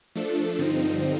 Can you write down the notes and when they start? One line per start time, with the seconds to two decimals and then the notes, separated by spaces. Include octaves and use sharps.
0.15 F3 A3 D4 A4
0.59 G2 D3 F3 C4 D#4